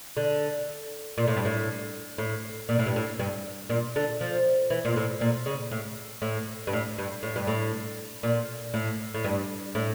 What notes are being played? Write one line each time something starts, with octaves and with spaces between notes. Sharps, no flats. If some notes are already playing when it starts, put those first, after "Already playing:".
D3
A#2
A2
G2
A2
A2
A#2
A2
G2
A2
G2
A#2
D3
F3
E3
A#2
A2
A#2
C#3
A2
A2
G2
A2
G2
A2
G2
A2
A#2
A2
A2
G2
A2